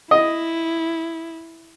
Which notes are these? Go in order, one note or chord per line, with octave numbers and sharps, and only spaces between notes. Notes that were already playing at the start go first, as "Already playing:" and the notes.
E4 D#5